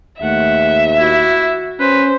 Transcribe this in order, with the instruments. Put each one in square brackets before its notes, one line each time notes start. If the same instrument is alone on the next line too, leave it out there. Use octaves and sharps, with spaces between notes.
[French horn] D#2 [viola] A3 F#5 [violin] E5
[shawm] E4 [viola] F#4
[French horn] C#4 [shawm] B4 [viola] C5